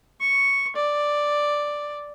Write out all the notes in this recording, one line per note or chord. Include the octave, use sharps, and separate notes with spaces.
C#6
D5